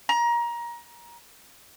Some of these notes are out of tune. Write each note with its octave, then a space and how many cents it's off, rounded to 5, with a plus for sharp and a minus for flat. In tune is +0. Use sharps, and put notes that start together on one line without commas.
A#5 +25